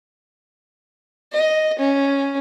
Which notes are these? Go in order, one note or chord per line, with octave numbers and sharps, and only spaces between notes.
D#5
C#4